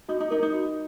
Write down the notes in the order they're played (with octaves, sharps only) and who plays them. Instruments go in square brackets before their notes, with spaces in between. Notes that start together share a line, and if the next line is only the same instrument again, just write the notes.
[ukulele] D#4 [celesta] F#4
[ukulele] D#4
[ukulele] D#4 [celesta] A#4
[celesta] D#5
[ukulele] D#4
[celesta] F#4